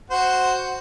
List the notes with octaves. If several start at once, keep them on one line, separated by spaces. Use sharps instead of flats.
F#4 C5